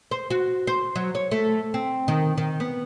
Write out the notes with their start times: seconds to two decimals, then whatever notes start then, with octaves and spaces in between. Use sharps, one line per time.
0.11 C5
0.30 F#4
0.67 C5
0.96 F#3
1.15 C#5
1.31 A3
1.74 C4
2.08 D#3
2.38 D#3
2.60 B3